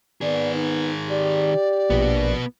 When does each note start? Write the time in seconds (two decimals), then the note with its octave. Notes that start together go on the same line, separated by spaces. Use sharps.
0.21 D#3 B3 G#4 D5
0.54 D#4
1.09 G4 D5
1.90 A#1 B2 B3